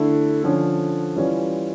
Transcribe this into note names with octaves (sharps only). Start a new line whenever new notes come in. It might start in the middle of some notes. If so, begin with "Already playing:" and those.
Already playing: D3 A3 E4
D3 F3 C#4
E3 G3 C#4 F4